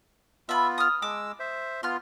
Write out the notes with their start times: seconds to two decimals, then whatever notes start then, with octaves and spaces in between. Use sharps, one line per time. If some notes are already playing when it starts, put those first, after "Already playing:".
0.49 B3 F4 E5 B5
0.78 D#6 F6
1.02 G#3 D6 E6
1.40 C5 E5
1.83 B3 F4 C6 F6